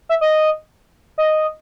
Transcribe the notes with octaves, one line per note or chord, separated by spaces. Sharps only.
E5
D#5
D#5